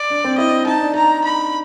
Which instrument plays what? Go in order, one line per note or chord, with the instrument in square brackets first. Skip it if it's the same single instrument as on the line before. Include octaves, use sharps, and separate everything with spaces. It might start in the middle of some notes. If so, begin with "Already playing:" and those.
Already playing: [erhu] D5
[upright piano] D4
C4
[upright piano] E4 [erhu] D#5
[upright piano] D#4 [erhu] A5
[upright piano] D4
[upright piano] D#4 [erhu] A#5
[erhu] B5